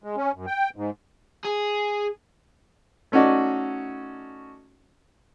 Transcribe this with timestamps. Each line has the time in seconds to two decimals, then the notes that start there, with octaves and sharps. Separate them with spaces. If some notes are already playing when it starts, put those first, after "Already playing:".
0.03 G#3
0.17 C#4
0.35 F#2
0.47 G5
0.76 G#2
1.45 G#4
3.12 A3 C#4 D#4 F#4 D5